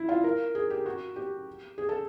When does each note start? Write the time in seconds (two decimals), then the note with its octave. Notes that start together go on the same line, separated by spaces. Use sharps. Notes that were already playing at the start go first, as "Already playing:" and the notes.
Already playing: E4
0.09 F4
0.24 A#4
0.55 G#4
0.70 G4
0.86 F#4
1.16 G4
1.78 G#4
1.89 A4